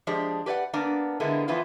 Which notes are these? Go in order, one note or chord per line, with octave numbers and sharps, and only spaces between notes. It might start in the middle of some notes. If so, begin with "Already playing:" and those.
F3 G#3 D4 G4
G4 B4 D5 F5 F#5
A#3 B3 D4
D3 G#3 A#3 B3 E4
E3 F3 B3 E4 F4